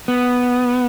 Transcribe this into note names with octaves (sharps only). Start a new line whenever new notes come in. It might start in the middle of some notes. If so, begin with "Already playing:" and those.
B3